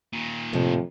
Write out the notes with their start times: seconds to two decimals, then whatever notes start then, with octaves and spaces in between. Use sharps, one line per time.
0.13 A#2 D#3
0.53 F2 A2 C3 F3